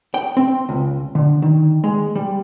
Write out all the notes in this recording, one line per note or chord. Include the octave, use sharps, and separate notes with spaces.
G5
C4
C#2
D3
D#3
G#3
G3